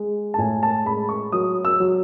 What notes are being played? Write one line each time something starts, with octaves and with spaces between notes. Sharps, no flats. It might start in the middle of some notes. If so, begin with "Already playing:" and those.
Already playing: G#3
A5
A2 G#5
A5
G#3 B5
C#6
F#3 D#6
E6
F#3